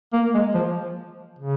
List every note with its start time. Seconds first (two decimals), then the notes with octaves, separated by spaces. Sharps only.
0.13 A#3
0.34 G#3
0.54 F3
1.39 C#3